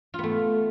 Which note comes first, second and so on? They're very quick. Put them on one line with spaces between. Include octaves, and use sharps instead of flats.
F4 B3 A3